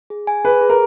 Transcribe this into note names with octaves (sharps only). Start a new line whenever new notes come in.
G#4
G#5
G#4 B4
G#4
A#4